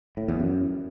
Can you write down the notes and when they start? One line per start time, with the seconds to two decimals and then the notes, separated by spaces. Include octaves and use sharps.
0.17 A2
0.28 E2
0.40 F#2